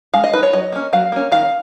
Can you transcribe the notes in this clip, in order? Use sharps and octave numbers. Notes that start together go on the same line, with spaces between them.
G#3 F5
D#5
D#4 B4
C#5
F#3 D#5
A#3 C#4
F#3 F5
A#3 C#4
D#3 F5